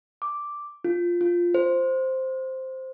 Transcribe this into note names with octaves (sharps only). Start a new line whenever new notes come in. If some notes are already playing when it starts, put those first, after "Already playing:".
D6
F4
F4
C5